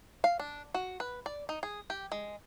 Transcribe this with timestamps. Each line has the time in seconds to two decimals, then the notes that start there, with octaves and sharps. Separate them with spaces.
0.24 F5
0.39 D4
0.74 F#4
1.00 B4
1.26 D5
1.49 D#4
1.63 G#4
1.90 G4
2.12 G#3